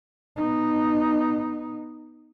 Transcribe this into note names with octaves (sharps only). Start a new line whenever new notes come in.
B3 D#4